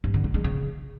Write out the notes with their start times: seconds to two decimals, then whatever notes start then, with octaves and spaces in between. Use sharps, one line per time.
0.04 G2
0.14 D3
0.24 G#3
0.34 G#3
0.44 C#3